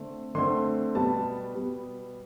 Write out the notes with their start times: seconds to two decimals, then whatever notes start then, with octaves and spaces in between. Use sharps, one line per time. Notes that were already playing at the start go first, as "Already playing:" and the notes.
Already playing: D3 A3 C4
0.35 D3 A3 C4 C6
0.95 B2 G3 B3 A5
1.54 B2 G3 B3